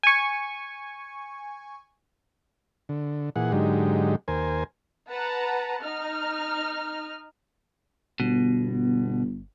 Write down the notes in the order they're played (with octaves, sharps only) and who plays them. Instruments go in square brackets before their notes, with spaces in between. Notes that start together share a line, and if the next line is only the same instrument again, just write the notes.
[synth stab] G#5 C#6
[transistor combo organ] D3
A#2 E3 G#4 F#5
G#2 D3 F#3 G#3 D#4 G4
D#2 A#4 C5 G#5
[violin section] B4 F#5 A5 A#5
D#4 F6
[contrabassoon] G1 [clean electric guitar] B2